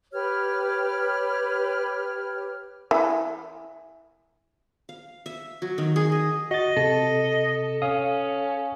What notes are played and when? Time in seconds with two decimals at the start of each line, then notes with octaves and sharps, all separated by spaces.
0.13 G4 B4 C#5 F6
2.91 E3
4.89 F5
5.26 E5
5.62 F#3
5.78 D#3
5.96 G#4
6.12 D#5
6.51 F#4 D#5 A6
6.77 C3 A4
7.82 C#4 F5 D#6